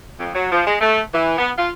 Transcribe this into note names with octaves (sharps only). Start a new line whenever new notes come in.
F2
F#3
F3
G#3
A3
E3
B3
F4